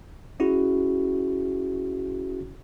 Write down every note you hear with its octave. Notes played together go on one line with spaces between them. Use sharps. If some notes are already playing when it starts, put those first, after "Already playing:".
C#4 E4 F#4 G#4